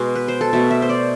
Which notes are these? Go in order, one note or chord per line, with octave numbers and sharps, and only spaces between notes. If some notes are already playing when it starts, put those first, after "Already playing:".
Already playing: B2 G#3 B3
B4
C5
A4
B2 A3 E5
E5
C5
D5